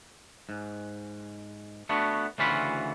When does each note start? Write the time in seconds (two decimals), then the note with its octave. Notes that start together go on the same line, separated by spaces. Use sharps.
0.49 G#2
1.89 A3 B3 D4 F#4
2.38 D2 C#3 E3 F4 F#4 B5